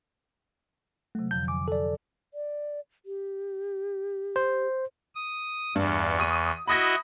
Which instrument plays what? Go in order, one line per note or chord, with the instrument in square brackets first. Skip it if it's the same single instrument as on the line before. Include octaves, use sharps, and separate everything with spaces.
[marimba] C3 F#3 [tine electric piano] A3
[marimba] F2 D3 F3 [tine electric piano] G6
[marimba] G#5 [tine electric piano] D6
[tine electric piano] A4 D5
[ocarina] D5
G4
[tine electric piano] C5
[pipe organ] D#6
[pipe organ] E2 [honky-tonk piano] G2
[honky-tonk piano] C#6 D#6 D#7
[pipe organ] E4 F#4 D#5 [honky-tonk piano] B5 D#6 A#6